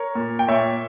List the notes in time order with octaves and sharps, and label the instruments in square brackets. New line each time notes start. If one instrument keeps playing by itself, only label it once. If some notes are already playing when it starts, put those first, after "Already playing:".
Already playing: [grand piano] A#4 C#5
A#2
G5
A#2 C#5 E5